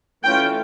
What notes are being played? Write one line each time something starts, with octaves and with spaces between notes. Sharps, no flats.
E3 A3 C#4 F4 G5